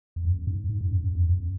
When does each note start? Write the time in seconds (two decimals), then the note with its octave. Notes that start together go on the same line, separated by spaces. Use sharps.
0.16 E2
0.25 F#2
0.47 G#2
0.69 G#2
0.81 F#2
0.92 F#2
1.04 F#2
1.15 E2
1.29 F#2